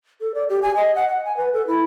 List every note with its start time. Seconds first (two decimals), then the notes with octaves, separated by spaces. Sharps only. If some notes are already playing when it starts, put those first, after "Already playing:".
0.21 A4
0.34 D5
0.49 G4
0.62 G#5
0.76 D#5
0.95 F#5
1.08 F#5
1.25 G#5
1.37 B4
1.53 A4
1.67 E4